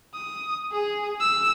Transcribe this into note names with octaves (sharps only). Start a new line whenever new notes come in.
D#6
G#4
E6